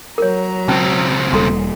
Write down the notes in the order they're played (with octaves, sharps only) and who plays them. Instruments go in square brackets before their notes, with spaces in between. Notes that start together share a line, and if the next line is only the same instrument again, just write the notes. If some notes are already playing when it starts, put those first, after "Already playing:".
[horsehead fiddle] F#3 A#5 [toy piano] A#4 C#5
[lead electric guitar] C#2 C4 [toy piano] C#4 A5
[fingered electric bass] E1 G3 A#3 [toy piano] A4 A#5 C6